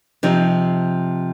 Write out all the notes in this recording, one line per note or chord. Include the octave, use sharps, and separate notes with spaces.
C3 F3 D#4